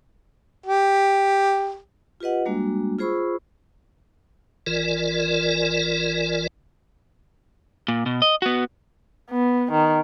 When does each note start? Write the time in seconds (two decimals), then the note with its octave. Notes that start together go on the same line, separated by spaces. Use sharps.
0.66 G4
2.20 F4 G4 B4 D#5 F#5
2.45 G3 G#3 A#3 D4 F#4
2.99 F4 G#4 C5 B5 C#6 E6
4.67 G#1 E3 F4 A#4 D5
7.88 A#2
8.06 B2
8.22 D#5
8.42 B3 F#4
9.30 B3
9.72 D#3